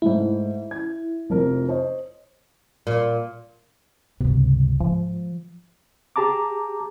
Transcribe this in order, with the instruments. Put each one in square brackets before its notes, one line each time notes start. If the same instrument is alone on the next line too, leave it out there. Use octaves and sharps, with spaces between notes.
[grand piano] G#2 G#3 A3 [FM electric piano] E4
[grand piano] G#6
F1 F2 A#4
C5 C#5 D#5
[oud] A#2
[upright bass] C#2 G2 [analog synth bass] C3
[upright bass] G#2 [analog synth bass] F3
[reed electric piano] G4 G#4 A5 A#5 D6